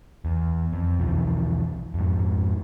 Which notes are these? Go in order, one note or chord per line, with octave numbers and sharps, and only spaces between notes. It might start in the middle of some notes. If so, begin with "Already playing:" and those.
E2
F2
B1 E2 F3
F2 G#2